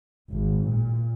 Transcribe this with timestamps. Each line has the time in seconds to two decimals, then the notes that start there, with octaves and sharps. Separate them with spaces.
0.30 G#1
0.67 A#2